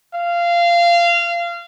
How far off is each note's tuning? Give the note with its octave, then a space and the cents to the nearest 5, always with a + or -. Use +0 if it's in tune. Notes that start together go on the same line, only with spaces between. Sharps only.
F5 -20